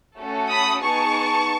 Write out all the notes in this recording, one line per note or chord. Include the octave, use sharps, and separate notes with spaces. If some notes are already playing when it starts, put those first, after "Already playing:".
A3 C#4 F#4 A4
B5 D#6
B3 D#4 G#4 A5 C#6